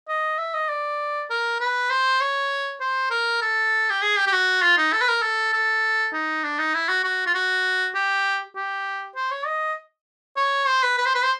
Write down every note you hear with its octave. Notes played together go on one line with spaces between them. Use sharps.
D#5
E5
D#5
D5
A#4
B4
C5
C#5
C5
A#4
A4
G4
G#4
G4
G4
F#4
F4
D#4
A4
B4
A#4
A4
A4
D#4
D4
D#4
E4
F#4
F#4
F4
F#4
G4
G4
C5
C#5
D#5
C#5
C5
B4
B4
C5
B4
C5